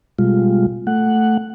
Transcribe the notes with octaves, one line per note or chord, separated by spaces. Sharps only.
B2 G3 G#3 F4
A3 F#5